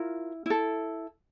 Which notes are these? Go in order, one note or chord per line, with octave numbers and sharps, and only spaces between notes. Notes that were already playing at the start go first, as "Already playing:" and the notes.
Already playing: E4 F4 A#4
E4 A4